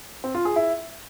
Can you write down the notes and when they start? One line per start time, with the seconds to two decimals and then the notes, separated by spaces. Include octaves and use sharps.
0.24 C4
0.35 F4
0.45 G#4
0.56 E4